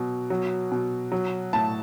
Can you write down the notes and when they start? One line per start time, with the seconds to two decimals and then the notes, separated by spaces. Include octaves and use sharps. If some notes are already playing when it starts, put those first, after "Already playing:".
Already playing: B2 F#3
0.30 F#3
0.72 B2
1.12 F#3
1.53 A2 A5